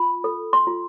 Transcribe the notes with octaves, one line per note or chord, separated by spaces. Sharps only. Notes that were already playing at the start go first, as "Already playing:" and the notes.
Already playing: F4 B5
A4
C6
F4